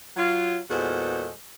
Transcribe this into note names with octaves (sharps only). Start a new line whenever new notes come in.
F#3 F4
E2 A#2 G#3 F#4 A4 C5